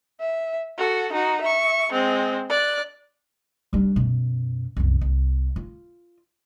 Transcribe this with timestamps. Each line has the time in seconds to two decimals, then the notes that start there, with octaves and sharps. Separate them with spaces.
0.20 E5
0.78 F#4 A4
1.12 D#4 F#4
1.41 E5 C#6
1.92 G#3 C4
2.50 D5 F#6
3.73 G3 D4
3.96 F#2 B2
4.77 C2 F#2
5.01 C2
5.56 F4